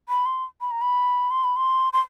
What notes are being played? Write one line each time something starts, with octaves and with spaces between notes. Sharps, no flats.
B5
C6
B5
A#5
B5
C6
B5
C6
C6